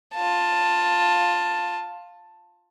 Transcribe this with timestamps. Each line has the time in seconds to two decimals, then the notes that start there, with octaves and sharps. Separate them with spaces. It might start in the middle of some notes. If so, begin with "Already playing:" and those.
0.14 F4 A5